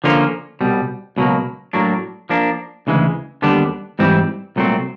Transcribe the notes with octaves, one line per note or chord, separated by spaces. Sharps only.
D3 F3 A#3 C#4 F4
C2 B2 G3
C#2 B2 F#3 A#3
A2 F#3 A#3 D4
F3 A#3 D4
D2 C#3 E3 G#3
D#2 D3 G3 B3 D4
G#2 E3 G3 C4 E4
C2 A#2 F#3 A3 C4